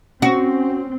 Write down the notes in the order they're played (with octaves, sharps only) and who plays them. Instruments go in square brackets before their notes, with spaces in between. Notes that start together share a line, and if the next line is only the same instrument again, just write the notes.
[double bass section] C4 [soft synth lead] C#4 [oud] F#4